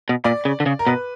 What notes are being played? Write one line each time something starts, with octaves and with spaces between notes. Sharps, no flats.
B2
A#2 D5
C#3
D3
C#3
A#4
B2 B4